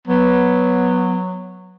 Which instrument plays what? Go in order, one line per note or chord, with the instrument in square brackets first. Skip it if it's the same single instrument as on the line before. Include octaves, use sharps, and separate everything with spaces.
[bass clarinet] F#3 [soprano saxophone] B3